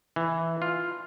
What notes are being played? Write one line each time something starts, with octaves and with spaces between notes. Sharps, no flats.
E3
F4